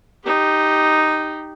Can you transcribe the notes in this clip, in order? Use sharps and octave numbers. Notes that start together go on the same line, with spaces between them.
D#4 G4